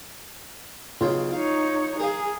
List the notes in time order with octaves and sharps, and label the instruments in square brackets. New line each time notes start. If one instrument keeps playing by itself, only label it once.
[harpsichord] B1 C#3 G5 [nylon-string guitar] F4
[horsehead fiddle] D#4 C#5 [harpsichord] F5
[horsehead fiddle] G#4 [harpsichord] A#4 F5